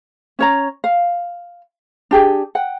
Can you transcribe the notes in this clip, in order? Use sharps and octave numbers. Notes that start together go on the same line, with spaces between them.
C#4 C#5 A#5
F5
D4 G4 G#4
F#5 G5